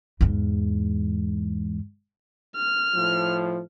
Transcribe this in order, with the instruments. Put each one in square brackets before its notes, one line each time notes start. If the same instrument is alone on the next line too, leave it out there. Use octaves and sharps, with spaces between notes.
[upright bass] E2 G#2
[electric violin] F6
[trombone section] A2 F3